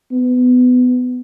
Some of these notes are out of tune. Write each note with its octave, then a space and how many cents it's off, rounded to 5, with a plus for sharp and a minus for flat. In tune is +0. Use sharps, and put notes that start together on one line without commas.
B3 +20